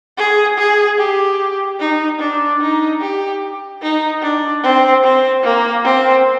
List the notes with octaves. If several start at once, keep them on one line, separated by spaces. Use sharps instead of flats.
G#4
G#4
G4
D#4
D4
D#4
G4
D#4
D4
C4
C4
A#3
C4